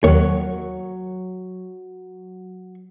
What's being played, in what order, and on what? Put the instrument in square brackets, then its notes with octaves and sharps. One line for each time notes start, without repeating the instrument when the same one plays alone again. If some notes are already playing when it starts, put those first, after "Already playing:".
[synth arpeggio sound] D#2 D#3 [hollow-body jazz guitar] F#3 C#5